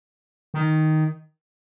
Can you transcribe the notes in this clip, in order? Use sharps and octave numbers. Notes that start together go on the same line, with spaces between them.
D#3